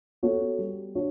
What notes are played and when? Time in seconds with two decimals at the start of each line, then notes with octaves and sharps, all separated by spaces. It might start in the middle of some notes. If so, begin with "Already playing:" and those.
0.23 B3 F#4 A4 C#5
0.58 G3
0.95 D4 F#4 C#5